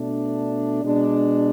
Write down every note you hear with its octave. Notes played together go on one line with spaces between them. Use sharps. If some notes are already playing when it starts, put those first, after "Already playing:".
Already playing: B2 A3 D4
B2 G#3 D4